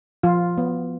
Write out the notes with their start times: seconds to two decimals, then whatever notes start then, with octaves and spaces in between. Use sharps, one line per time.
0.23 F3 F4
0.58 B3